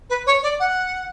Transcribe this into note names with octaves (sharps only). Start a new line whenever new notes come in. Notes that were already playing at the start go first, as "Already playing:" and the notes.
B4
C#5
D5
F#5